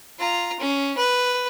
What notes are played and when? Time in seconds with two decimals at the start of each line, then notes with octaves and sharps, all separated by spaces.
0.19 F4 A#5
0.60 C#4
0.97 B4